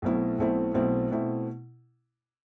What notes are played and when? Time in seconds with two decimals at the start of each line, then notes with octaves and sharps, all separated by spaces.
0.02 B1 B2 A3 C4 E4
0.38 B1 B2 A3 C4 E4
0.74 B1 B2 A3 C4 E4
1.11 B2 A3 C4 E4